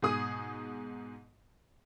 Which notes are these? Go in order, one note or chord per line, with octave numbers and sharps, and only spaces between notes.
G#2 B2 G#4 D#6